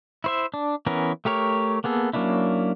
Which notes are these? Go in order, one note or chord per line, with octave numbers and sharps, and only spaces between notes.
E4 C5 E5
D4
E3 B3 C#4 A#4
A3 G4 A#4 C#5
A#3 B3 G#4 A4
F#3 A#3 C#4 D4 E4